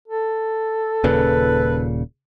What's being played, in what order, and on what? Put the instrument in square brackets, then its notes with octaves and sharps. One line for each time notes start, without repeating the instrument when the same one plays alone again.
[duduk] A4
[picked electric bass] D#1 A#2 C#3 [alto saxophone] B4